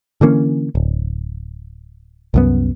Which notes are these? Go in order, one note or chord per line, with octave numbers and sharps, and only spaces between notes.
D3 E3 A#3 C#4
D1
C2 F#2 B3